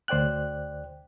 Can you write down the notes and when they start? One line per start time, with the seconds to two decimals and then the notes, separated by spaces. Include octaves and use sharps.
0.08 D2 C5 D5 G5 F#6